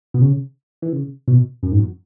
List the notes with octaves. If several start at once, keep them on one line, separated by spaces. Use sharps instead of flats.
B2
C#3
E3
C#3
B2
F#2
G#2
F#2